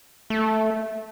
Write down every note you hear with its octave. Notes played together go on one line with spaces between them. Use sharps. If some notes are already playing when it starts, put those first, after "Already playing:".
A3